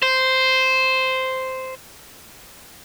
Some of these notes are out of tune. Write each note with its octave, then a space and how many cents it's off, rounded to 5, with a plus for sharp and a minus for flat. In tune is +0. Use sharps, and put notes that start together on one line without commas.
C5 -5